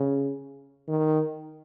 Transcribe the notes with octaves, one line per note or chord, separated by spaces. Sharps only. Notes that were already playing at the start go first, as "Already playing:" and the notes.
Already playing: C#3
D#3